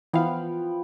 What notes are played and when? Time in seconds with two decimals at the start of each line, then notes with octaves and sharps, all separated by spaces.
0.13 E3 F3 B3 F5 G5